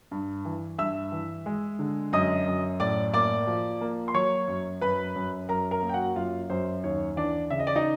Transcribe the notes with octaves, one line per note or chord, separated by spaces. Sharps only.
G2
E3
G2 E5 E6
E3
G#3
D3
F#2 D#5 D#6
F#2
A2 D5 D6
A#3 D5 D6
F3
A#3
C6
F#3 C#5 C#6
F#2
F#2 B4 B5
F#2
F#2 A#4 A#5
A#4 A#5
A#3
G5
F#4 F#5
F#2 F4 F5
F#2 C5
D#2 C#5
E3 D4 D5
C#3 E5
D#5
D5
D#4 D#5